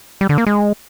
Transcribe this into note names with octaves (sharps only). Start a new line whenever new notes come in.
G3
D3
A#3
G#3